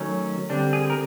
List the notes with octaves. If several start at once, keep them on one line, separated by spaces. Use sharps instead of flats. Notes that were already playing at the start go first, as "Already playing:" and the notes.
Already playing: D#3 F#3 A3 C#4
D3 G3 C4 D4
G#4
A#4